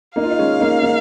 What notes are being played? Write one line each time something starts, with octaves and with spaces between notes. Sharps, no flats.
A#3 D#4 F5
F4
D#4
G#3 C#4
A#3 D#4
A#3 D#4